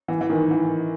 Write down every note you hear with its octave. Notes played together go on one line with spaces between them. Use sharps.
E3
E3
D#3
E3